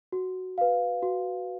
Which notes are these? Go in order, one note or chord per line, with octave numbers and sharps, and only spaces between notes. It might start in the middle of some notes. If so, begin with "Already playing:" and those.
F#4
B4 F5
F#4